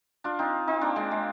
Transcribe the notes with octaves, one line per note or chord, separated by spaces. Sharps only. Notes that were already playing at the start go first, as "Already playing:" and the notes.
D4 F4
C4 D#4
C4 D#4
A#3 D4
G#3 C4
G#3